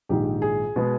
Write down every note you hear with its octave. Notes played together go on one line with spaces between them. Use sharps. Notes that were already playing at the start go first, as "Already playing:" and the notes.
A#1 G#2 D#3 G4
G#4
B2 G#3 B3